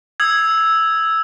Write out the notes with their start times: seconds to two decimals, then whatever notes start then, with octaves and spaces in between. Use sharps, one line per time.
0.20 D#6 E6 G#6